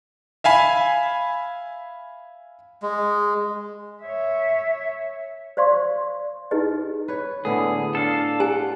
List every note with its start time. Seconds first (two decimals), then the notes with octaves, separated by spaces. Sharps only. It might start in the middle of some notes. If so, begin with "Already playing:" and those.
0.44 E5 F5 G#5 B5
2.82 G#3
4.04 C#5 E5
5.57 C5 D5 F5 C6 C#6
6.51 D#4 E4 G4 G#4 B4 D#5
7.08 B4 C#5
7.45 A2 D3 B3 E4 G#4
7.95 D4 A4 F5
8.40 G4 F#5 G#5